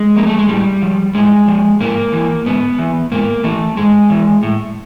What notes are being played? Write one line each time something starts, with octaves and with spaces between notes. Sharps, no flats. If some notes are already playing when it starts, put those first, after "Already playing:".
Already playing: G#3
F3 A#3
A3
G#3
A2 G3
F3
A2 G#3
F3
G#2 A#3
E3
G#2 B3
E3
G#2 A#3
E3 A3
G#2 G#3
E3
A2